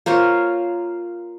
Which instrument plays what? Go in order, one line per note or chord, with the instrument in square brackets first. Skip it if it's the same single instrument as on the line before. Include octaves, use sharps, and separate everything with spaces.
[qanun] A#3 F4 C5 C#5